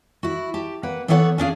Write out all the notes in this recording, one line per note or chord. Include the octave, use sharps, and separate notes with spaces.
E4 F#4
G4 A5
A#3 B4 F#5
E3 B3 A4 C#5 F5 F#5
C#4 D4 G#4 F5